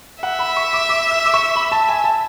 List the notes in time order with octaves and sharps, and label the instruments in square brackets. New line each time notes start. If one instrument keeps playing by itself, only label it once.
[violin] E5 [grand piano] F#5
[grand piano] B5
C#6
D6
D6
E6
D6
C#6
B5
A5
G#5
A5